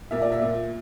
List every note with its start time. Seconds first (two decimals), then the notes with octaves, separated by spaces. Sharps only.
0.11 A#2 E5
0.22 D5
0.32 E5
0.42 A#2